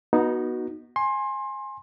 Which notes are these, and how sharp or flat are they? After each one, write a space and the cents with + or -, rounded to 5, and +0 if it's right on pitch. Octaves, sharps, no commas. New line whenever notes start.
B3 -25 D#4 +0 F#4 +0
G#5 +0 C6 +25